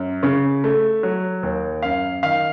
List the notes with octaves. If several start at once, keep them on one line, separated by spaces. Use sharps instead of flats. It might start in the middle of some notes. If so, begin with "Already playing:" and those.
Already playing: F#2
C#3
A3
F#3
D#2
F#2 F5
D#3 F5